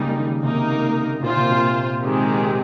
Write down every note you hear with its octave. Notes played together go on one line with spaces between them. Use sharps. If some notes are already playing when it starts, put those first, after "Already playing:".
Already playing: C#3 G3 G#3 A#3 D#4
D#3
C3 A#3 D#4 A#4
A#2 A#3 F4 C5
C3
A#2
D#3 G#3 C4 G4